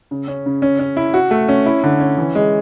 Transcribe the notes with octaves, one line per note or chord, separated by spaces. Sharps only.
C#3
C#4
C#3
C#4
C#4
E4
F#4
A3
C#4
E4
D3
C#4
E3
G#3